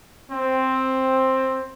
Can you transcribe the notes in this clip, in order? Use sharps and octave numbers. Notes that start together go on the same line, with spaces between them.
C4